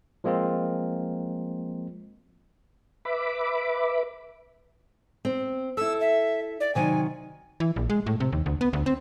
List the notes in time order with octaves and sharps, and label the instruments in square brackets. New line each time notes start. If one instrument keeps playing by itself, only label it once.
[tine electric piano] F3 G#3 A#3 C4 F4
[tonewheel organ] B4 E5 B5 D6
[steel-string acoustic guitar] C4
[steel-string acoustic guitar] E4 A4 [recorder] E6
[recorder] E5
D5
[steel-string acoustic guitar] C3 D#3 F#3 [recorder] G#5
[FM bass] E3
A#1
G#3
A2
C3
D#2
D2
B3
D2
C4